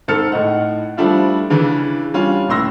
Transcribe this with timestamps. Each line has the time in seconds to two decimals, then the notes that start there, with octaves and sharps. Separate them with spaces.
0.08 G#2 C4 A4 F6 A6 C#7
0.32 A2 D#4 F#5
0.97 F3 G3 A3 D4 E4 F4
1.50 C#3 E3 D4
2.14 G3 C#4 D4 F4
2.49 D1 A2 C6 E6 A#6